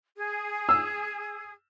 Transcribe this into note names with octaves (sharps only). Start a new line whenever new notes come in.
G#4
E6